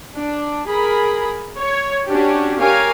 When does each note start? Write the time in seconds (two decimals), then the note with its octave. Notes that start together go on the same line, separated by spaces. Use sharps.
0.15 D4
0.68 G#4 A#4 B5
1.58 C#5
2.06 C#4 D4 F#4 G4
2.60 G4 A#4 C#5 F5 G#5